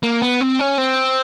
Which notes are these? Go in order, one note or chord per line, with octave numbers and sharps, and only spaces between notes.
A#3
B3
C4
C#4
C4